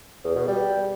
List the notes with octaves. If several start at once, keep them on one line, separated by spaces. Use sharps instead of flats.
E2
B2
G3